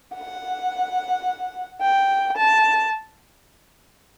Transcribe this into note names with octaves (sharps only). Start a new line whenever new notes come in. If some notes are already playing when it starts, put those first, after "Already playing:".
F#5
G5
A5